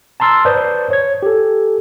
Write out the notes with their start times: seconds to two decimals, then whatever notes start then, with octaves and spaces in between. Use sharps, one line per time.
0.20 A5 A#5 C6 E6 F6 A6
0.45 B4 C5 D5 A5 D#6 G6
0.90 C#5 G#6
1.23 G4 A4